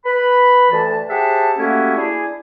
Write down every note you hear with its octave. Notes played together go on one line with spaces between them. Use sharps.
B4 B5
D2 E3 A5
G4 G#4 C5 E5 F#5 A5
G3 A3 A#3 C#4 E4 F#4
D4 E4 G#4